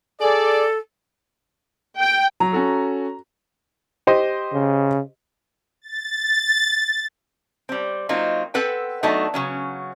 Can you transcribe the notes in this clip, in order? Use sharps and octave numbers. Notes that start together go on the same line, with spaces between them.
G#4 A4 D5
G5
F#3 A#5
C#4 F#4 A4
G4 C5 D#5
C#3
A6
G3 C4
F#3 A#3 C4 D#4 F4
C4 A4 B4 F#5 G5
F#3 A3 B3 D4 D#4
C#3 F#3 C#4